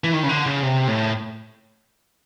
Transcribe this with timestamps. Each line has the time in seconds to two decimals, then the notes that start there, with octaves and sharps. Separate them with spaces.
0.04 E3
0.13 D#3
0.23 C#3
0.29 D3
0.46 C#3
0.63 C3
0.87 A2